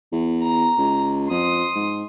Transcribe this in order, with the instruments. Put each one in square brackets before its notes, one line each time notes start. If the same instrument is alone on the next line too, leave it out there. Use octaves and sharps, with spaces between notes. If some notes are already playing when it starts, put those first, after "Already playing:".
[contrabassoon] E2
[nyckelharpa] A#5
[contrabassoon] C#2
[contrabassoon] F2 [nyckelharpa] C6 D#6
[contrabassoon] G#2